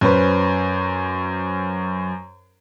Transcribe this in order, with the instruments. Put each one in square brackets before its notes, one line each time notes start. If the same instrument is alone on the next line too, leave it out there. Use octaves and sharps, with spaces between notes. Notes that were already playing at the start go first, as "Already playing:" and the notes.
[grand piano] F#2 C#4 B4 C5